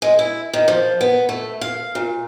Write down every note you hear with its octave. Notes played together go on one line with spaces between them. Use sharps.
G#3
E4
D#3
F3
B3
A3
F5
A#2